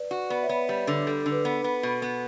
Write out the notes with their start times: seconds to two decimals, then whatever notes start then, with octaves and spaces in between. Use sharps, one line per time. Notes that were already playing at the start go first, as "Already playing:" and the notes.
Already playing: B4 D5
0.11 F#4
0.30 B3 B4 D5
0.42 C#5 E5
0.49 B3
0.55 B4
0.69 G3
0.87 D3
1.06 G3 A4
1.19 A4
1.26 D3
1.32 B4
1.45 B3
1.64 B3
1.83 B2
2.02 B3